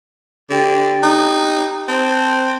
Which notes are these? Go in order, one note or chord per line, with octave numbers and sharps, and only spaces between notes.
D3 G4 G5
D#4
C4 C5 A5